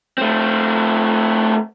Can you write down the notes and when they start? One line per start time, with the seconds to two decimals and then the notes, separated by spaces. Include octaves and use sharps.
0.18 A3 C4